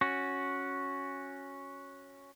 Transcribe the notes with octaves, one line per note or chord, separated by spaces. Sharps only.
C#4 F#4